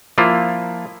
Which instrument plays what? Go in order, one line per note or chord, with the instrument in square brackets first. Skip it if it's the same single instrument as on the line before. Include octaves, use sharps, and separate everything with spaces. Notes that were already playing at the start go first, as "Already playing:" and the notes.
[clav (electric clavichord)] F3 A#3 E4 F4